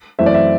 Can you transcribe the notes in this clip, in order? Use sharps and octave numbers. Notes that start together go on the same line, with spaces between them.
F#2 E3 A3 C4 E5
D5
E5